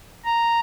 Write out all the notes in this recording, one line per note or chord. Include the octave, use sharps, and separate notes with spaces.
A#5